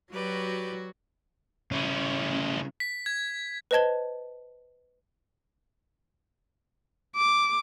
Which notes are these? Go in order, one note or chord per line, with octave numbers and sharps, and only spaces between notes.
F#3 F#4 G4 B4 D5
C2 C#3 C#4 E4
B6
G#6
B4 C5 D#5 A5 G#6 G7
D6